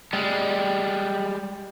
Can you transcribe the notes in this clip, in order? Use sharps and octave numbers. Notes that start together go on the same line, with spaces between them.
G3 G#3